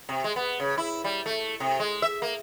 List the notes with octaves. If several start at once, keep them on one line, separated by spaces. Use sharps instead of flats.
C3
G#3
B3
C#3
E4
G3
A3
C3
G#3
E5
A#3